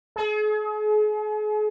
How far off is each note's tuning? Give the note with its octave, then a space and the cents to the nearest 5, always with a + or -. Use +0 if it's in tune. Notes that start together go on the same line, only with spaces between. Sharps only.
G#4 +40